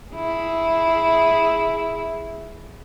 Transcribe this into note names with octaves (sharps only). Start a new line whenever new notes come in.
E4 G#4